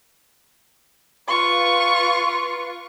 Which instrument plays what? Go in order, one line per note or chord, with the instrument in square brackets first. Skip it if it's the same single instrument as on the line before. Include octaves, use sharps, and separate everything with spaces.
[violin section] F4 B4 [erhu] C#6